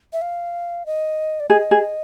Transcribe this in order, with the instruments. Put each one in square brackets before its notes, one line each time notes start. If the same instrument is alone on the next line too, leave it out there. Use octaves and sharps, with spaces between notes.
[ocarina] E5
F5
D#5
D5
[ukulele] G#4 [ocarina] D#5
[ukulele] G#4